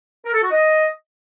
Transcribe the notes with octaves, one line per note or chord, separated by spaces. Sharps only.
A#4
A4
F#4
D#5